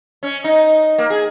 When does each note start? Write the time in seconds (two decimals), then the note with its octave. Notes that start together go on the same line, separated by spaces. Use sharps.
0.23 C#4
0.44 D#4
0.98 A#3
1.10 G#4